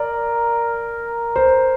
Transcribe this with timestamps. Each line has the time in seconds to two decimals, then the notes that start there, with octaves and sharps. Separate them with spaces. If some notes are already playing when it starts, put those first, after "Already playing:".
Already playing: A#4 D5
1.36 C5